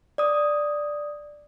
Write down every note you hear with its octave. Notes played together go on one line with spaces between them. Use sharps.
D5 D#6